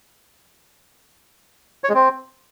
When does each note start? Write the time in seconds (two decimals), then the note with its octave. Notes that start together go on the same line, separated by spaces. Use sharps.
1.84 C#5
1.89 G#3
1.94 C4